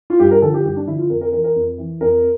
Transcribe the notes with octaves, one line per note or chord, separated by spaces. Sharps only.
F4
G2 G4
A#4
D3 F3 A4
G4
G2 G4
D4
D3 F3 E4
F4
F2 A#4
A#4
E3 A#4
A#4
F2
E3
F2 A#4